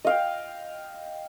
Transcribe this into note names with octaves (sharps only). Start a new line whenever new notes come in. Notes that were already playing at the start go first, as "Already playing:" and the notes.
D#5 F5 G5